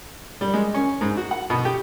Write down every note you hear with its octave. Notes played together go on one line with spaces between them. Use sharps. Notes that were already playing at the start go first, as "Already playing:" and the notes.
G3
G#3
C#4
G#2
F#4
F#5
B2
G4